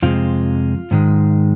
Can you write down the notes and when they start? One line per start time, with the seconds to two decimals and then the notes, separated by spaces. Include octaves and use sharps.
0.02 F2 C3 G#3 F4
0.91 G#2 D#3 G#3